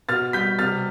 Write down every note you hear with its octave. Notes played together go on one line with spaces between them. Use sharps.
B2 F6 A6
G3 G6 B6
C3 F6 A6